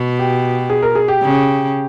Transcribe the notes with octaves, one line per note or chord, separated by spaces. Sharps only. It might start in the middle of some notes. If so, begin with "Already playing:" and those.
Already playing: B2
G4
G#4
A#4
G#4
G4
C#3